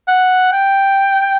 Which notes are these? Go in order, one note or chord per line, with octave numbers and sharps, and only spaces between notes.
F#5
G5